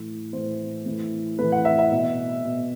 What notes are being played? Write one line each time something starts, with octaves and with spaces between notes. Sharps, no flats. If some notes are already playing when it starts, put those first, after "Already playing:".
Already playing: A2 E3
A2 E3 C5
A2 E3
A2 E3 B4
F#5
E5
E5
B2
B2